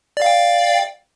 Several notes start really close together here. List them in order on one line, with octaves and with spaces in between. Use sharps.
D5 F5 G5